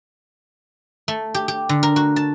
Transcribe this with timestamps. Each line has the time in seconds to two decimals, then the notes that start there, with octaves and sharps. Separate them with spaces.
1.08 A3
1.34 G4
1.48 G4
1.69 D3
1.83 A#4
1.96 F#4
2.16 A5